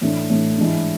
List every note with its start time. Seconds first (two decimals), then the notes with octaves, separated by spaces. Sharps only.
0.01 A2 E3 A3 D4
0.30 A2 E3 A3 D4
0.58 G#2 E3 G#3 D4